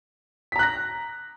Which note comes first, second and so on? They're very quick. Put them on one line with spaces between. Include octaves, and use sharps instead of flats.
B6 A#5 F#6 A#6